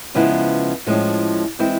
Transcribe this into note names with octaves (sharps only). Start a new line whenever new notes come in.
C#3 F3 G#3 B3 E4
A2 F3 G#3 C#4
E3 G#3 C4 E4